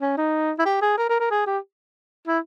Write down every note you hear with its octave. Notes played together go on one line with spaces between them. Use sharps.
C#4
D#4
E4
G4
G#4
A#4
A#4
A#4
G#4
G4
E4